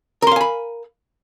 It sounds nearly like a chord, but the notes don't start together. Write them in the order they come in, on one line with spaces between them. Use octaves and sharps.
A#4 C6 F5 G#5 B5